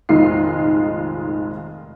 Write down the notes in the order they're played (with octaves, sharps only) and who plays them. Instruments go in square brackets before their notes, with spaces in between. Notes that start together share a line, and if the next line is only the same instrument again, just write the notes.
[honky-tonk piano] F1 A#1 D#3 G#3 F4 C7